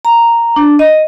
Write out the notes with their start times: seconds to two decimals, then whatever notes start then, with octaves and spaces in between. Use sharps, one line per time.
0.05 A#5
0.56 D4
0.79 D#5